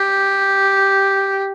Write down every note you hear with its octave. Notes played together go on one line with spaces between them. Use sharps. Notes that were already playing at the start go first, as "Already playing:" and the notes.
Already playing: G4